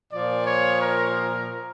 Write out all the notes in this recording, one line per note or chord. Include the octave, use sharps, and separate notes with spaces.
A#2 F3 D5
C#5
A#4